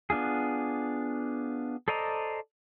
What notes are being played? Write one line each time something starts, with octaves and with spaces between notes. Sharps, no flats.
B3 D4 F4 G#4
A4 C5 D5 D#5 A#5